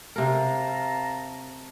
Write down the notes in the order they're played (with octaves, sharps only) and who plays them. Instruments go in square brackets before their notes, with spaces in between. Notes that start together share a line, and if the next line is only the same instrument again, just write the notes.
[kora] C3 A#4 [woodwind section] F5 A5 A#5